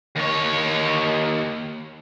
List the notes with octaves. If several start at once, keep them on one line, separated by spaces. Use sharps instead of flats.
D#2 C#5